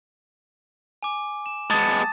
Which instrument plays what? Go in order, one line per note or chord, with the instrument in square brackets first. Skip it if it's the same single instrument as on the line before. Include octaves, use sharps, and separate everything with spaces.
[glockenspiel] G#5 D6
E7
[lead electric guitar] G#3 B3 [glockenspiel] A5 D#6 A6